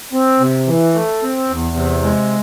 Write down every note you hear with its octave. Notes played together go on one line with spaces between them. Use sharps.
C4
C3
E3
A3
C4
E2
C3
G#3